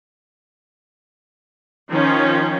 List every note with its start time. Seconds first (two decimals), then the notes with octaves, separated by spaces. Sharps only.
1.89 D#3 F3 C#4 D#4 F4 G5